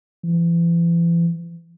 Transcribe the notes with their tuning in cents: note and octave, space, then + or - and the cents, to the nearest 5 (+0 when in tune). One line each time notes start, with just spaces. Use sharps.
E3 +40